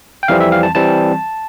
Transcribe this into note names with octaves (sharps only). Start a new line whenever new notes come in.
G5
F2 E3 G3 C4 F5
E5
F5
A5
E3 G3 C4 A5